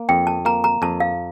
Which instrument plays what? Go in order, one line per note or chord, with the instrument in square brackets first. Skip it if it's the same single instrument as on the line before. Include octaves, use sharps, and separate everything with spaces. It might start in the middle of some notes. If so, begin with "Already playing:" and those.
Already playing: [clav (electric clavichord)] A#3
[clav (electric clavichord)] F2 [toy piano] G5
[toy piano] A5
[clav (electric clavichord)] A#3 [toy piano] A#5
[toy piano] A#5
[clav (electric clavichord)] F2 [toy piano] A5
[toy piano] F5